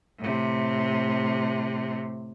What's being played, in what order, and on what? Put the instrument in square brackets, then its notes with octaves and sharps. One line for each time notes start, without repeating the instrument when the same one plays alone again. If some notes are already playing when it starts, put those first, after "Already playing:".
[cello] A2 C3